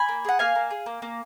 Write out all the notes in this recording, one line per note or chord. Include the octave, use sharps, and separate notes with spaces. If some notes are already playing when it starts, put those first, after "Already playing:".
Already playing: G#5 B5
A#3
G#4 F#5
A#3 F5 G#5
A#3
G#4
A#3
A#3